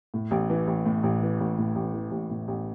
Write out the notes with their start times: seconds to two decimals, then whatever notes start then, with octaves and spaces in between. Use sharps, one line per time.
0.14 A2
0.31 A1
0.50 E3
0.67 A1
0.86 A2
1.03 A1
1.22 E3
1.40 A1
1.58 A2
1.75 A1
1.94 E3
2.11 A1
2.30 A2
2.48 A1